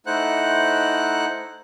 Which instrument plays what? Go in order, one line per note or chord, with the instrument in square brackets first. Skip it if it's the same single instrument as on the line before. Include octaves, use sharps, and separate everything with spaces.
[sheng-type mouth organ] A3 D#4 E4 C5 F#5 F#6